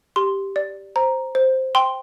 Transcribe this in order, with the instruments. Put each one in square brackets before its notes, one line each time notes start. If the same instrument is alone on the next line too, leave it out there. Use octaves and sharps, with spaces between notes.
[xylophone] G4 C6
D5
C5 A#5
C5
G5 C6